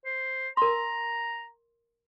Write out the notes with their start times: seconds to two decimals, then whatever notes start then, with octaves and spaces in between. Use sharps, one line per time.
0.05 C5
0.57 A#4 A#5 C6